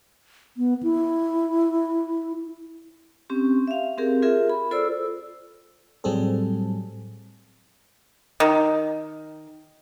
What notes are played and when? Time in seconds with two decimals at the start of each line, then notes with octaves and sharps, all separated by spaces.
0.57 B3
0.83 E4
3.30 C4 C#4 G4
3.67 E5 F5
3.98 C4 G4 G#4 A#4
4.22 F4 G#4 A#4 E5
4.50 B5
4.71 F4 A4 C5 D5 E6
6.04 A2 F#3 G3 C4 G#4 A4
8.40 D#3